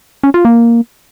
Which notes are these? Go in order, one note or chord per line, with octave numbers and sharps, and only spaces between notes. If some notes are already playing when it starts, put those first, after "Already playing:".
C#4
F4
A#3